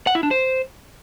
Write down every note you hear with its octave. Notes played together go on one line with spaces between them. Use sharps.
F#5
E4
D4
C5